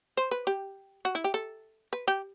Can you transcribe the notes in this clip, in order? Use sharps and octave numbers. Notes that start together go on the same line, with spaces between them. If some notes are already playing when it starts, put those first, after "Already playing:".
C5
B4
G4
F#4
E4
G4
A4
B4
G4